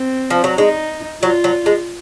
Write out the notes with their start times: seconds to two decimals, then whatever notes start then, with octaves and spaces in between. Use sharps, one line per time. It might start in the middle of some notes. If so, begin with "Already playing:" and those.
Already playing: C4
0.30 F3
0.44 F#3
0.58 G#3 D#4
1.23 F#3 F4
1.44 F#3
1.66 G#3